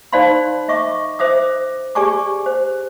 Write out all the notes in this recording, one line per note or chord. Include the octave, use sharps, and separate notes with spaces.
D#4 C5 D5 F5 B5 C6
D#5 E5 C#6 D6
C5 E5 D6 D#6
G4 G#4 D5 G#5 C#6 D6
C5